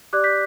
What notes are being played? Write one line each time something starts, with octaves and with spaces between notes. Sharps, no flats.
G4 D5 D6 F#6
G6 B6